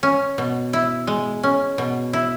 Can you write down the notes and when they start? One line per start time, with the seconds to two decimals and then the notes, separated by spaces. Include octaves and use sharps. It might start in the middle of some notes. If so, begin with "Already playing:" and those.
0.03 C#4
0.38 B2
0.73 E4
1.07 G#3
1.43 C#4
1.78 B2
2.13 E4